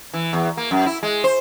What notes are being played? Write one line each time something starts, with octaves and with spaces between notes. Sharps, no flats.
E3
E2
A#3
F#2
E4
G#3
C5